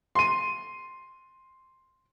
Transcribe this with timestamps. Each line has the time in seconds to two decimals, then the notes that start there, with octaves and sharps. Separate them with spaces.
0.15 C6 D#7